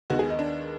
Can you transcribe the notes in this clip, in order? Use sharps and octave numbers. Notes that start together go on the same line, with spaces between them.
D#2 D#3 G#3 B3 F#4
G#4
D#4
D4